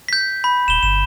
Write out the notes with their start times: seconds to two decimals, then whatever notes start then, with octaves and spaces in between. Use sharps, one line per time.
0.08 G6 B6
0.44 B5
0.68 D#1 E7 G7
0.83 G1 E7